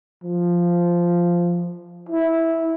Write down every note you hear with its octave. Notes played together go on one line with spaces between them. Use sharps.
F3
E4